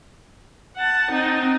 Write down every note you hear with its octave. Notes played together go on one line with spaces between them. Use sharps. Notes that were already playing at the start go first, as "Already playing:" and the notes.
F#5 A5
C4 D#4